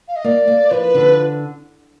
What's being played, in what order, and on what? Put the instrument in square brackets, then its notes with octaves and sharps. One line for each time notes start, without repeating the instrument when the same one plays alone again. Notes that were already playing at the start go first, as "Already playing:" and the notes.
[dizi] F5
D#5
[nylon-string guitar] A#3 [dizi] D5
[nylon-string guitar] A#3
[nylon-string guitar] F3 [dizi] B4
[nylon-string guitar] D3